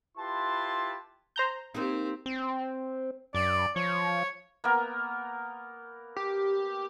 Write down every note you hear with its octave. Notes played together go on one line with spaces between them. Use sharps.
E4 F4 G4 B4 A5 C6
C5 A#5 G6
A#3 C4 D#4 G4
C4
F#2 D5
F3 C#5
A#3 B3 A#4
G4